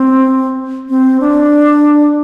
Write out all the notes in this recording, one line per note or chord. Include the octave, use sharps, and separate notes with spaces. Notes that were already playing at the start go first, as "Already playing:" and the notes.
Already playing: C4
C4
D4